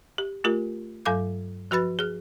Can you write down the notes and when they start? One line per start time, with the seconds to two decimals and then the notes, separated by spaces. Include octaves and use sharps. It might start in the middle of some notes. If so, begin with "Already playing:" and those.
0.18 G4
0.44 A3 F4 G4 A#4
1.06 G2 F#3 A4 F5 D6 G6
1.71 F3 F#4 B4 B5 A6
1.99 G#4 F6